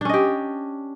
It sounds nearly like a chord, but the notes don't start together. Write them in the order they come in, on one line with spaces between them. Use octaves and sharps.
D4 C#4 D#5 G4